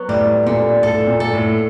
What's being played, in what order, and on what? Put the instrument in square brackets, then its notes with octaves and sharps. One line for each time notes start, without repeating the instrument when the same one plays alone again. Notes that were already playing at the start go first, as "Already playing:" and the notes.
Already playing: [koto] F#3 B3
[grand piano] A2 [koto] G3
[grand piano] A#2 [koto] D3
[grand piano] A2 [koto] A4
[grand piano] A#2
[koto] A4
[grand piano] A2